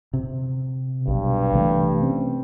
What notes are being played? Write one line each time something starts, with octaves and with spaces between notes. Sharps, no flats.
C3
B1 G2
C3 E3 A3
C4 C#4